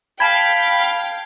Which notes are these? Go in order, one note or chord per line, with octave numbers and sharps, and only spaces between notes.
F5 G5 A5 B5 G#6